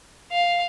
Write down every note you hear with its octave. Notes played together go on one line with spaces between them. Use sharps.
F5